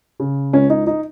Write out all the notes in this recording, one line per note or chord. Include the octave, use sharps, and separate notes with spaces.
C#3
C#2 C#4
D#4
D#4